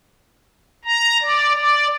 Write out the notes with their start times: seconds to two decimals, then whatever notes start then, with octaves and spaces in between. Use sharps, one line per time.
0.85 A#5
1.21 D5
1.54 D5